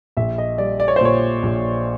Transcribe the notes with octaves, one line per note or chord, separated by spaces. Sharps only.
A#1 E5
D#5
G3 D5
D5
C#5
C5
A#2 C#5
A#1